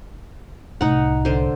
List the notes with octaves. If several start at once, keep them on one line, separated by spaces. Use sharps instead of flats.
C2 A2 D#4 F#5
D3 C5